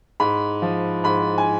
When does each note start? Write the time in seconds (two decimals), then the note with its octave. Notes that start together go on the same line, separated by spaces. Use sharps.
0.20 G#2 B5
0.62 F3
1.04 G#2 B5
1.38 G#5